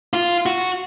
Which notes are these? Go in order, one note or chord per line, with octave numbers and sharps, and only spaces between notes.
F4
F#4